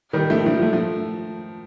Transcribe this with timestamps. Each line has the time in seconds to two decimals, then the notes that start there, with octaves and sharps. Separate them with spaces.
0.13 D#3 G3
0.30 F3 A3
0.46 F3 A3
0.62 F3 A3
0.73 F3 A3